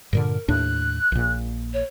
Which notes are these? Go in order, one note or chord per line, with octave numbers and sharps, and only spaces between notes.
G2 A#2 D3 A#4
D#2 A2 D4 F#6
A#1 A#2
C#5